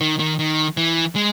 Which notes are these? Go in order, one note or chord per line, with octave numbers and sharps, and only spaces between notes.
D#3
D#3
D#3
E3
G#3